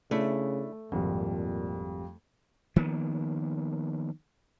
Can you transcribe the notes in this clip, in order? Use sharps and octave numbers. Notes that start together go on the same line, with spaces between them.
C#3 A3 D4 E4
G#1 F2 A#2 G3
D#3 F3 A#3 B3